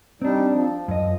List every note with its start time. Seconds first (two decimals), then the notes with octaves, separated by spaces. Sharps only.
0.22 G3 C4 D4 D#4
0.51 F3
0.88 F#2 D#5